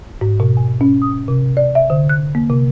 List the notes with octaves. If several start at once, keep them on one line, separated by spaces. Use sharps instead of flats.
G#2
B2
G#5
C#4
D#6
C3
D5
E5
D3
F#6
A#3
C3